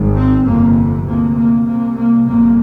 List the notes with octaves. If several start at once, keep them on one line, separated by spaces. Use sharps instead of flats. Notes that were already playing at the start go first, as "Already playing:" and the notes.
Already playing: G#1 G#2
C4
G1 F2 C3 A#3
D2 C3 A#3
A#3
C2 C3 A#3
A#3
G1 F2 C3 A#3